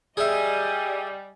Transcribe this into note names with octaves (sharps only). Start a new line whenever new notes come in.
G3 G#4 D#5 E5 G#5